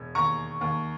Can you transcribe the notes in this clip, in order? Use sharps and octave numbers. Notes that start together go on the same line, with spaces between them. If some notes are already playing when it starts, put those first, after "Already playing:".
Already playing: E1
D#2 A#5 C#6
D#2